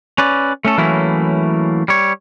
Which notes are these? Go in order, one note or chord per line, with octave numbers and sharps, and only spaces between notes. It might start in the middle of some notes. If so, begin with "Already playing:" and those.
C#4 B4 D5
A3 C#4 A4
E3 F#3 A3 A#3 C#4 E4
G3 C#5